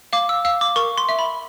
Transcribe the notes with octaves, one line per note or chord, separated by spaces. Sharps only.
F5 D6
E6
F5 E6
D6
A#4 C#6
C6
E5
B5